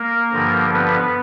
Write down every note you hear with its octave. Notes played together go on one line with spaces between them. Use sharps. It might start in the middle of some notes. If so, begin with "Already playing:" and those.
Already playing: A#3 A#4
G2 D3 F3
B3 B4